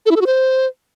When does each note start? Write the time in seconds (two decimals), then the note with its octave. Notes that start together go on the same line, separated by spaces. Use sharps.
0.06 A4
0.11 E4
0.16 A4
0.21 F#4
0.26 C5